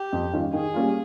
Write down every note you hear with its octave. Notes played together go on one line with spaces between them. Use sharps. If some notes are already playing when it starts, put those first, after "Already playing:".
Already playing: G4
F2
D#3 G3 C#4 F4
D#3 G#4
G3 A#3 C#4 F4